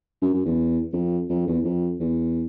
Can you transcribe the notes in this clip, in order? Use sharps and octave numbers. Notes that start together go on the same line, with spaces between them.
F#2
F#2
E2
F2
F2
E2
F2
E2